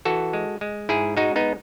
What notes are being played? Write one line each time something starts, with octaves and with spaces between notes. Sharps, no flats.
E3 F#4 A4
G#3
G#3
G#2 E4 G#4
G#3 D#4 F#4
B3 D#4